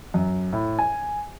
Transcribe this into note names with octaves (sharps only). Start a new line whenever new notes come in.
F#2
A2
G#5